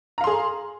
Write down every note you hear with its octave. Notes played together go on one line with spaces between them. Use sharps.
G#4 F5 A#5 C6